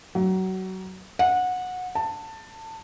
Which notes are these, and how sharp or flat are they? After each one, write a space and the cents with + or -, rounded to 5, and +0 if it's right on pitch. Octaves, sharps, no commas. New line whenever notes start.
F#3 +25
F#5 -20
A5 +20